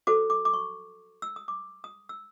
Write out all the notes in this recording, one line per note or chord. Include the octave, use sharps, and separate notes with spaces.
F#4 A4 C5 D6
D6
D6
C#6
E6
D#6
D6
D#6
E6